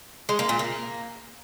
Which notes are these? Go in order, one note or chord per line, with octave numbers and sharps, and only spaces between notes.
G#3
A#3
A#2
A#3